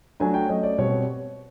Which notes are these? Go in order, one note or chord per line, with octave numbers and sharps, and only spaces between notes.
F#3 A3 D4 G#5
G5
F#3 A3 C#4 D#5
D5
B2 G3 C4 C#5